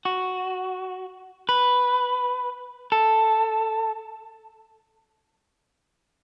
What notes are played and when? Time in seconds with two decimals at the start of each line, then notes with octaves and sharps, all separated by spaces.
0.05 F#4
1.49 B4
2.92 A4